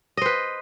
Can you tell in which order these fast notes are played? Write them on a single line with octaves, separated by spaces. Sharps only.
D#5 C5 B4